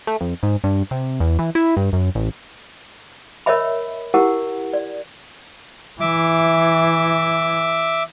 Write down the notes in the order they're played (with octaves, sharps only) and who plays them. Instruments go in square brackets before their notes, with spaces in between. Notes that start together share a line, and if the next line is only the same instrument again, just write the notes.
[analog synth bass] A3
F2
G#2
G2
C3
E2
E3
E4
G2
F#2
A1
[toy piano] A#4 C#5 D#5 E5 B5
E4 G4 A#4 F#5
D5
[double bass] E3 [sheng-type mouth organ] E5 D6